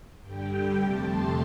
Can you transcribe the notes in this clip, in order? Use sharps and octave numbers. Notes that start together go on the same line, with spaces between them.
G2 D3 G3 G5
F2 C3 A3 A5
C6